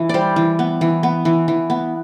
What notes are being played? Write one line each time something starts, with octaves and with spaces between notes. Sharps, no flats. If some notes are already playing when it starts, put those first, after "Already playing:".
Already playing: E3
G3 C5 D5
E3
B3
E3
B3
E3
E3
B3